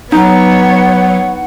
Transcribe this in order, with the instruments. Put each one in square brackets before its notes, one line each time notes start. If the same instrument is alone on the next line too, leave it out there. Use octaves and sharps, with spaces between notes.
[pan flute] F#3 [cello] B3 C#5 [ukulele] D#4 [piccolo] F#5